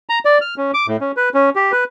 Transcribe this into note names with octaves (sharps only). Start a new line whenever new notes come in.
A#5
D5
F6
C#4
D6
A2
C#4
B4
C#4
G4
B4